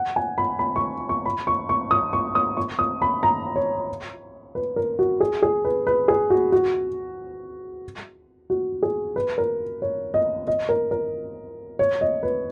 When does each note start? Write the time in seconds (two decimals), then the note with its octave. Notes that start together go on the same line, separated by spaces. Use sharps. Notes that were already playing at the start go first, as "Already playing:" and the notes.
Already playing: F#5
0.16 G#5
0.38 B5
0.59 B5
0.76 C#6
1.09 C#6
1.26 B5
1.47 C#6
1.69 C#6
1.91 D#6
2.13 C#6
2.35 D#6
2.57 C#6
2.79 D#6
3.02 B5
3.23 A#5
3.56 C#5
4.55 B4
4.76 A#4
4.99 F#4
5.20 G#4
5.43 G#4
5.65 B4
5.87 B4
6.08 G#4
6.30 F#4
6.52 F#4
8.50 F#4
8.83 G#4
9.16 B4
9.38 A#4
9.82 C#5
10.14 D#5
10.47 D#5
10.69 A#4
10.91 A#4
11.79 C#5
12.01 D#5
12.23 B4